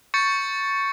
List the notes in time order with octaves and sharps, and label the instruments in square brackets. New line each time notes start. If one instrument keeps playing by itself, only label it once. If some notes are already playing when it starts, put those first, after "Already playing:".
[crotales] C#6 G6 A6 C#7